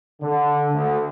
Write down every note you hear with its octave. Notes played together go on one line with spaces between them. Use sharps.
D3
D2